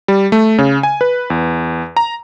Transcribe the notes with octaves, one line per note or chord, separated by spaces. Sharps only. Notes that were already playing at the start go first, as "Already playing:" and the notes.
G3
A3
C#3
G#5
B4
E2
A#5